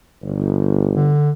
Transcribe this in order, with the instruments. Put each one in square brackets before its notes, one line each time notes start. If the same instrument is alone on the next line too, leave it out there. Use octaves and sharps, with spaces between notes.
[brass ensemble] G1
[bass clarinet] D3